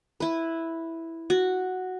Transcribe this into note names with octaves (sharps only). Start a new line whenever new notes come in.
E4 B4
F#4